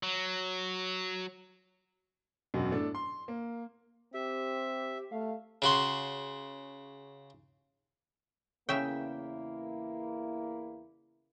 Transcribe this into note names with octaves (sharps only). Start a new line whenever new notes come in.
F#3
E1 F#2 F#4 D#5
A2 D4 A4
C6
A#3
C4 G4 E5
A3 F5
C#3 F#4 C6
E2 C#3 A#3 E4 E5 G5